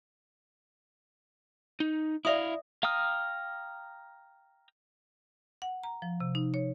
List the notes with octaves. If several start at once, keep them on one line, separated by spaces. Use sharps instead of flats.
D#4
E4 D5 E5 F5 D#6
F5 G5 A#5 D#6 F6
F#5
A#5
F3
C3
D#4
C#5